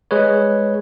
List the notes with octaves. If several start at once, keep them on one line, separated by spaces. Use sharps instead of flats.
G#3 G#4 B4 C#5